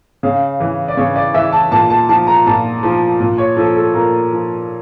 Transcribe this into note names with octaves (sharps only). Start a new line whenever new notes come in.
C#3 F5
E3
D5
C#3 C#5
D5
E3 E5
A5
A#2 A5
A5
F3 A5
A#5
A#2 A5
F3
A#2
C#5
F3 A4
A4
A#2 A#4
F3